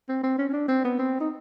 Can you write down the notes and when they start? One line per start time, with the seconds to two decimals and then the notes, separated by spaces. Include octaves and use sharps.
0.09 C4
0.23 C4
0.38 C#4
0.49 C#4
0.53 D4
0.68 C4
0.84 B3
0.99 C4
1.21 D#4